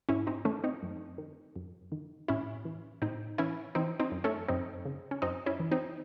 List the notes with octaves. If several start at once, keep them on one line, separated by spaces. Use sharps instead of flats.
G#2 C#4 E4
C4 D#4
D#3 A3 C#4
C4 D#4
F#2
D#3
F#2
D#3
A2 C#4 E4
E3
A2 C4 D#4
E3 C#4 E4
E3 C4 D#4
C4 D#4
F#2
A3 C#4
F#2 C4 D#4
C#3
C#4
F#2 C4 D#4
C#4 E4
E3
C4 D#4